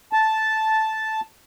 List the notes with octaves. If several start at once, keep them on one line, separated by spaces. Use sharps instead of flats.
A5